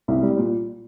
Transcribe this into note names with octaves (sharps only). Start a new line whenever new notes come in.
C2
G3
A#2